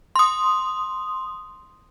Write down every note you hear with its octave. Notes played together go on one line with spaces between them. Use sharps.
C6 D#6